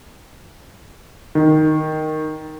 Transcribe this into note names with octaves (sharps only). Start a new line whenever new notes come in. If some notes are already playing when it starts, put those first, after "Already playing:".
D#3